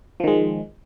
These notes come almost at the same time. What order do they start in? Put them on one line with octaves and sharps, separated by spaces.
F3 D#3 G#3